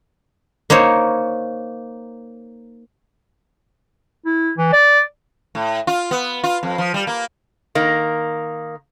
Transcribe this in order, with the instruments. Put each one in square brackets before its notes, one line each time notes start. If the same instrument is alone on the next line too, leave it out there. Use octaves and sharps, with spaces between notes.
[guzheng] A#3 D#4 C5 C#5
[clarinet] E4
E3
D5
[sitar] A2
F4
B3
F4
F2
F3
G3
A#3
[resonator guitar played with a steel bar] D#3 A#3